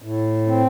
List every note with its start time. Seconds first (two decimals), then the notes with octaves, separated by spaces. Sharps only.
0.02 A2
0.46 C4